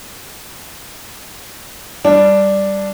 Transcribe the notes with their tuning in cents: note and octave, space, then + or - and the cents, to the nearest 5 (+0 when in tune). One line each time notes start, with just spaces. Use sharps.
G3 +0 D4 +0